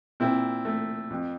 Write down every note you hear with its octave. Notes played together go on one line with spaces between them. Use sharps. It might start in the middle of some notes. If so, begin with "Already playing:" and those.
A#2 C4 E4
A3
F2